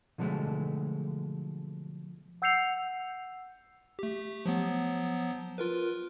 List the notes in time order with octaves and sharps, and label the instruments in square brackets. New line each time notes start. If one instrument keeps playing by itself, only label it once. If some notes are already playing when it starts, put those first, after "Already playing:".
[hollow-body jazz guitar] B2 D3 F3 F#3 G#3 A3
[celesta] F#5 E6 G6 C7 C#7 F7
[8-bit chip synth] A3 G4
F3 F#3 B3
F4 A#4 B4